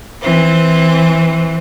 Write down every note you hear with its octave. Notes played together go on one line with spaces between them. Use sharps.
E3 C4